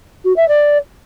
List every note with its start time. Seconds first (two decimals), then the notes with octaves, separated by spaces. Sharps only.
0.24 F#4
0.36 E5
0.48 D5